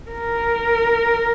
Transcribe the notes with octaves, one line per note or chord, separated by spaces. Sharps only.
A#4